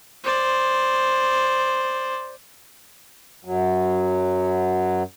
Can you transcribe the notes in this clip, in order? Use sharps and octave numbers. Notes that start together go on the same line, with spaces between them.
C5 D5
F#2 F#3